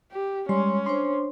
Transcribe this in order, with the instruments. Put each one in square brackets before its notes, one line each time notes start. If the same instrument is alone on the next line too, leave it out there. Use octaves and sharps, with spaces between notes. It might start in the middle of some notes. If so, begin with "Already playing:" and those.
[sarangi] G4
[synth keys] G3 [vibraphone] G#3 C6 [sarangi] C#4
[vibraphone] D4 C5 [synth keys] C6